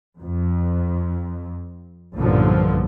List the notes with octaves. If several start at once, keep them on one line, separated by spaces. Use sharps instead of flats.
F2
B1 G2 A#2 D3 F3